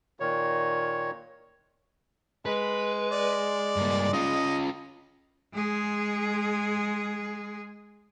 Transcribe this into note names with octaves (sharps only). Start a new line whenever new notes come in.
A#2 D#3 C#5
G#3 B4
D5
G2 A#3
C#4 F4 D#5
G#3 G#4